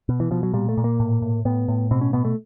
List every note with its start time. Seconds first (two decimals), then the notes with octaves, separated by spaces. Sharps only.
0.09 B2
0.20 E3
0.31 B2 F3
0.43 F#3
0.54 A#2 G3
0.69 A3
0.77 A#2
0.84 A#3
1.00 A2
1.22 A2
1.45 A2 B3
1.68 A2
1.91 B2 C4
2.01 C#4
2.13 B2 B3
2.25 A3